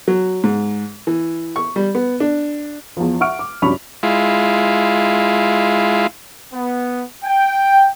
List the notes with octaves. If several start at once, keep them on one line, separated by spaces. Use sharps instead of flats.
F#3
G#2
E3
C#6
G3
B3
D4
E2 F3
E5 F#5 C#6 F6 D7
D6
C2 F#2 D4 B5 C#6 F7
G#3 E4 F4
B3
G5